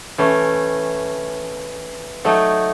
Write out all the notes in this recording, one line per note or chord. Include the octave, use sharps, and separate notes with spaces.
E3 A3 C#4
F#3 A3 D#4